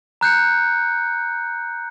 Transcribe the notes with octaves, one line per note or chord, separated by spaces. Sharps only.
A#5 F#6 G6 C#7